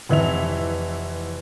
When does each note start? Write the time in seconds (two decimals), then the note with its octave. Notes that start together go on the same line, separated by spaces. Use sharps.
0.09 F1 E3 E5 F7